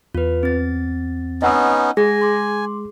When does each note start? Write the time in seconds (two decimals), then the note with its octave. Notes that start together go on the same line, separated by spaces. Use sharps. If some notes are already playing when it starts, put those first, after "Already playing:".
0.15 E2 F4 B4
0.43 C4 A6
1.42 B3 C#4 D#4 D#5 F#5 E6
1.97 G#3 G#4 G#5 A#6
2.21 C6 D6